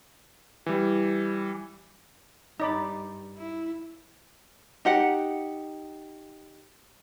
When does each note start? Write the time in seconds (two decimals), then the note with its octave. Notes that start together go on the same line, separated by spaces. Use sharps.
0.66 E3 G3
2.60 G2 D#4 D5 B5
3.37 E4
4.85 D#4 G4 F#5